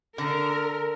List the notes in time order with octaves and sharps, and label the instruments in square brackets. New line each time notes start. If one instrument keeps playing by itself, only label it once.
[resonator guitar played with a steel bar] D3 [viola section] A#4